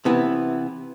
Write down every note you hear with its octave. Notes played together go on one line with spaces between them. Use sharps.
C3 E3 B3 E4